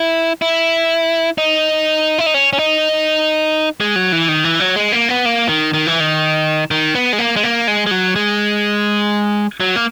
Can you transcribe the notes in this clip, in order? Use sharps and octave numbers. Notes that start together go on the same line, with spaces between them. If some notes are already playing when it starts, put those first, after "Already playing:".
Already playing: E4
E4
D#4
E4
D#4
C#4
C#4
D#4
G#3
F#3
E3
D#3
E3
F#3
G#3
A#3
B3
A#3
D#3
D#3
E3
D#3
D#3
B3
G#3
A#3
G#3
A#3
G#3
G#3
F#3
G#3
F#3
A#3